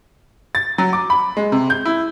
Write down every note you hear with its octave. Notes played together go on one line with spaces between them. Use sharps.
A6
F#3
D6
B5
G#3
C3
G6
E4